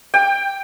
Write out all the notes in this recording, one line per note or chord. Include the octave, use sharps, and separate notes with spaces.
G5